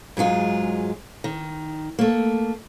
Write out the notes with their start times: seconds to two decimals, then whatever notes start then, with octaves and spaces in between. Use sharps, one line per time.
0.17 G#2 F#3 G#3 F4
1.24 D#3
1.99 A3 A#3